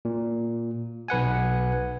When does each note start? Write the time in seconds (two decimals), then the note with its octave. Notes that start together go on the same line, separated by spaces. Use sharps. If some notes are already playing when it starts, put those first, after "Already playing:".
0.05 A#2
1.08 B1 B4 F#5 G#5